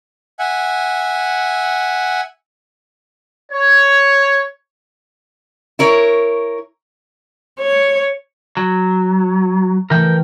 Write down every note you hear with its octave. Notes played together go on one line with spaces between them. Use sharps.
E5 F#5 G#5
C#5
E4 A#4 C#5
C#5
F#3
E3 A3 A#4 G5